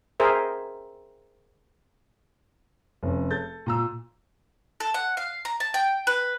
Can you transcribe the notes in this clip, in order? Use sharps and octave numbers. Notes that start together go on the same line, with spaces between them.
G#4 A#4 C5 E5
F1 C#4
A4 G6 A6
A#2 A#5 E6
A4
F#5
F5
A#5
A5
G5
B4